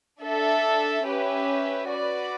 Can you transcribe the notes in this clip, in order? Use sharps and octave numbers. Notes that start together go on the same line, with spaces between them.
D4 A4 E5
C#4 G4 B4 E5
F#4 B4 D5